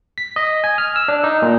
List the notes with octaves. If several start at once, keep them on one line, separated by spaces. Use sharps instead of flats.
B6
D#5
G#5
F6
E6
D4
D#4
A#2